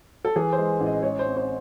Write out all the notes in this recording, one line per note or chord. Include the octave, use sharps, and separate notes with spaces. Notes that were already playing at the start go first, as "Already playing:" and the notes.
A4
E3 G#4
C5
G#3
A1
D#5
G#3 C#5
C5
C4
C5